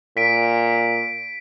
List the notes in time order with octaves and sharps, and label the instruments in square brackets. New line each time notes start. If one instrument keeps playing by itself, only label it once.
[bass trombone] A#2 [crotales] B6 D7